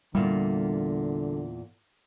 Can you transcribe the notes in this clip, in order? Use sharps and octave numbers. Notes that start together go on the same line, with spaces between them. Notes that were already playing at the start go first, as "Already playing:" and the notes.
E2 A#2 D3 G3